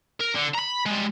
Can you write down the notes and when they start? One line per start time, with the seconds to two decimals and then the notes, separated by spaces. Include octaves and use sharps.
0.21 A#4
0.36 D3
0.55 A#5 B5
0.86 G3 G#3